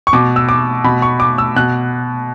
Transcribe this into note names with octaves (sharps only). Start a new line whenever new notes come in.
C#6
B2 D6
E6
D6
B2 B5
C#6
D6
E6
B2 F#6